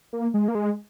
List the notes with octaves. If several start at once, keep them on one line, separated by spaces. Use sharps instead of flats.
A#3
G#3
A#3
G#3